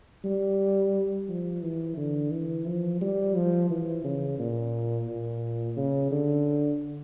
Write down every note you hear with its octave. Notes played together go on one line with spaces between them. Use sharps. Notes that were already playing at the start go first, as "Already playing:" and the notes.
G3
F3
E3
D3
E3
F3
G3
F3
E3
C#3
A#2
A#2
C#3
D3